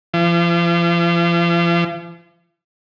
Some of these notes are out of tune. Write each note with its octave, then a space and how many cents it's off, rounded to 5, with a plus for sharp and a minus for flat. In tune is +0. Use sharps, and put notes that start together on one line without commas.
F3 -40